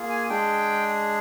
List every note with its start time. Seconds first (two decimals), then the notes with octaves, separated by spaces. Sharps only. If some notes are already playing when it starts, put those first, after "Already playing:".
Already playing: A#3 F4 G#4
0.10 G#5
0.29 G#3 D4 G#4 G5